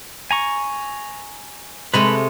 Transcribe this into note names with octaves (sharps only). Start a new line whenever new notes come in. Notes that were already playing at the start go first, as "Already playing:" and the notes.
G#5 A#5 C#6
C3 G#3 A3 B4 B5